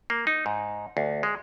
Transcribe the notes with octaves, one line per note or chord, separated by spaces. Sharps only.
A#3
D#4
G#2
D2
G#3